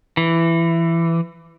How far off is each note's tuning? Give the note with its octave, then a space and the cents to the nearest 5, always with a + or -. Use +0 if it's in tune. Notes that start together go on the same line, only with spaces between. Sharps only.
E3 +15